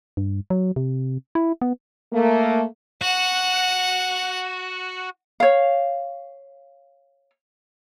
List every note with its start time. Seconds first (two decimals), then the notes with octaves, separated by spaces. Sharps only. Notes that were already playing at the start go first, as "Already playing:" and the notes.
0.17 G2
0.50 F#3
0.76 C3
1.35 E4
1.62 B3
2.12 A3 A#3
3.02 F#4 F#5
5.40 C#5 F5